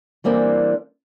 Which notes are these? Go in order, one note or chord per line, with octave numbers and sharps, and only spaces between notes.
E3 G3 A#3 C4 D4